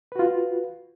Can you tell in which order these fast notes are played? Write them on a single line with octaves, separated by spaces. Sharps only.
B4 F#4 F4